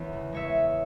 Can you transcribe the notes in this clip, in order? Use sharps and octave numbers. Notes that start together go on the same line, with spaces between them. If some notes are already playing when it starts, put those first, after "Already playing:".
Already playing: E2 E3 G#3 C#5 F#5
C#3
G#3 C#5 E5